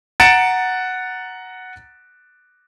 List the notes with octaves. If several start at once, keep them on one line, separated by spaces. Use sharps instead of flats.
F#5 A#5 A6 C#7 D7 E7